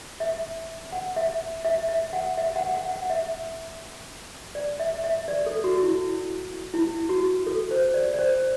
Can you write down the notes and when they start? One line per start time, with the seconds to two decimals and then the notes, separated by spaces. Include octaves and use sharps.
0.20 E5
0.92 F#5
1.16 E5
1.65 E5
1.89 E5
2.13 F#5
2.37 E5
2.56 F#5
2.75 F#5
2.92 F#5
3.10 E5
4.55 D5
4.80 E5
5.04 E5
5.28 D5
5.46 A4
5.64 F#4
5.83 E4
6.74 E4
7.09 F#4
7.47 A4
7.71 C5
7.94 D5
8.14 D5
8.19 C5